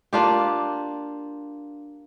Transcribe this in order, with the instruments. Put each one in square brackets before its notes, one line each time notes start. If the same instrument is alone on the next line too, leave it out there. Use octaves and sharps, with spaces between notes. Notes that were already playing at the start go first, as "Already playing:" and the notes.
[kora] A#3 D4 F4 G4